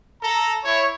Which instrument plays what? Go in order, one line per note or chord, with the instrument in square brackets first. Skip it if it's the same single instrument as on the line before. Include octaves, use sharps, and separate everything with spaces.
[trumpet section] A4 A#5
E4 C#5